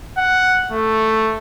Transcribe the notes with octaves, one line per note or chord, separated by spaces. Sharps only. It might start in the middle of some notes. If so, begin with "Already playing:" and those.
F#5
A3